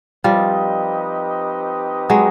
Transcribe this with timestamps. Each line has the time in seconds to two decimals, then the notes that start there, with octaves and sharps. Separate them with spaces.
0.24 F3 G3 C4 D#4 G4 B4 D#5
2.10 F#3 G#3